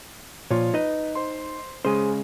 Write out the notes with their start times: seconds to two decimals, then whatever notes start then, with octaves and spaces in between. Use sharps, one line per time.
0.51 A#2 F3 F4 C#5
0.74 D#4 B4 D#5
1.15 C5 C6
1.85 C#3 G#3 G#4 C5